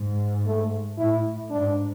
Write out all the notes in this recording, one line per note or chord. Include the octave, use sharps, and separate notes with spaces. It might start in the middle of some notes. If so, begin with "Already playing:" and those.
Already playing: G#2
A3
A2 E4
G#2 D4